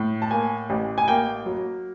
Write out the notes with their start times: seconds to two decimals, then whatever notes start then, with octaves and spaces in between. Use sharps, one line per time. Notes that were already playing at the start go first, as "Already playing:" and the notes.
Already playing: A2
0.22 A5
0.31 A#3 G#5
0.70 A1
0.98 G#5
1.08 A#3 G5
1.46 F#3